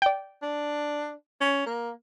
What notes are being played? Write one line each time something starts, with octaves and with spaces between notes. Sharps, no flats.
D5 G5
D4
C#4
A#3